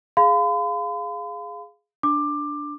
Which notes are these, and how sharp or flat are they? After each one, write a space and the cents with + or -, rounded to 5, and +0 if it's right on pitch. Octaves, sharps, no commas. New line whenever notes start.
G#4 +0 F5 +0 B5 +45
D4 +0 D6 +15